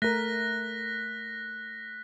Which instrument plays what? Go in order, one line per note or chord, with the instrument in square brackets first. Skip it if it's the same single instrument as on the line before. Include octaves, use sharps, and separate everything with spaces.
[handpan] A3 A#4 [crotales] F#6 A#6 B6